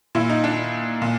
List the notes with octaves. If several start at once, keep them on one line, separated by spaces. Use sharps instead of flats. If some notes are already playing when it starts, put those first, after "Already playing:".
A#2 E4
D#4
D4
A#2